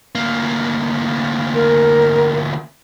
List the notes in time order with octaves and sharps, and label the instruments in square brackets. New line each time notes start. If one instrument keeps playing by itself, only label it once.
[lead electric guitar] D2 A#3
[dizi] A#4